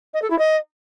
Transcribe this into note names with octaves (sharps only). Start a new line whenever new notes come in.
D#5
A4
E4
D#5